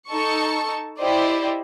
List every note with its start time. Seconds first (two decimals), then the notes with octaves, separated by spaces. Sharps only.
0.10 D#4 A4 A5 C#6 C#7
0.99 E4 G4 C5 D5 D#5